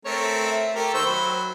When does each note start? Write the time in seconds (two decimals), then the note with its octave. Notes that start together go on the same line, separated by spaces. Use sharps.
0.05 A3 C4 A#4 C#5
0.46 E5
0.75 A3 A#3 G4 A#4
0.94 D#3 C5 C#6 E6
1.06 F#3 B5